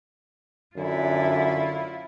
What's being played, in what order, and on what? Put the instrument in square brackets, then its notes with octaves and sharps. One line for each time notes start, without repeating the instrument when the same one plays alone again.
[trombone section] F#2 D3 [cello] E4 F4